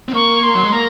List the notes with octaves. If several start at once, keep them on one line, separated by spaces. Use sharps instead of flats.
C4
A#3 C#6
C6
F#3
G#3
A#3 A#5